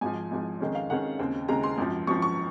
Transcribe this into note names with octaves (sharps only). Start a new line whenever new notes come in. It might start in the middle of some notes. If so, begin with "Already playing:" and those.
G#1 G#2 F3 G#5
G#1 G#2 F3
F2 D#3 G#3 C#4
F5
F2 D#3 G#3 C#4 F#5
D#2 C#3 G#3 C4
D#2 C#3 G#3 C4 A#5
C6
G#1 F#2 F3
G#1 F#2 F3 C#6
C#6